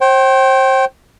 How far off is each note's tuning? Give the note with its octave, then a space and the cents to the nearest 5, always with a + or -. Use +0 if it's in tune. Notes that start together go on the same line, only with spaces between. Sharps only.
C5 +35 G5 -25